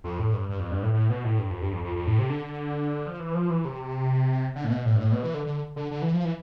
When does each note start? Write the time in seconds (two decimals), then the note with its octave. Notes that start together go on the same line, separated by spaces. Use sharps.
0.04 F2
0.19 A2
0.34 G2
0.49 G2
0.60 F2
0.71 G2
0.83 A2
0.94 A2
1.09 B2
1.24 A2
1.39 G2
1.50 F2
1.62 G2
1.73 F2
1.84 F2
1.95 F2
2.07 A2
2.19 C3
2.29 D3
3.07 F3
3.20 E3
3.35 F3
3.50 E3
3.65 C3
4.55 D3
4.64 A2
4.70 B2
4.85 A2
4.96 G2
5.00 A2
5.12 B2
5.23 E3
5.34 D3
5.46 D3
5.76 D3
5.91 D3
6.02 E3
6.14 F3
6.25 E3